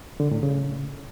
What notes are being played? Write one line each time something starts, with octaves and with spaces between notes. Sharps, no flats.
D3
A2
C#3